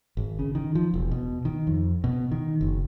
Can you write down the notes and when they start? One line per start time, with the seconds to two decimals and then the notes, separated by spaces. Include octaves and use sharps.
0.17 G#1
0.39 C#3
0.55 D#3
0.75 F3
0.94 E1
1.11 B2
1.45 D#3
1.67 F2
2.04 B2
2.31 D#3
2.61 F#1